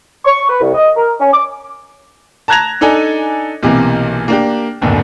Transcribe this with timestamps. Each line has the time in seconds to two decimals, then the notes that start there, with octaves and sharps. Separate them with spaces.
0.25 C#6
0.49 B4
0.61 C2
0.74 D#5
0.97 A#4
1.20 C#4
1.33 D6
2.48 A5 A#5 F#6 G#6 A#6 F7
2.81 D4 D#4 A4 D5 G#5
3.63 B1 C3 E3 A#3
4.28 A#3 D4 G4
4.81 D1 G1 D#2 D3